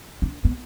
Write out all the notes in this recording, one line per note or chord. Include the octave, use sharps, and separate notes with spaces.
D4
B3